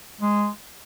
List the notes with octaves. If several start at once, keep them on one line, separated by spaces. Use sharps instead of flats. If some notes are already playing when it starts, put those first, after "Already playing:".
G#3